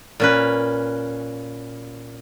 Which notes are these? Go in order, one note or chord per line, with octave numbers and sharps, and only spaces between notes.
A#2 C#4 B4